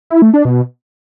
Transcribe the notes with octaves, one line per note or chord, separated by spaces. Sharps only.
E4
A3
D4
B2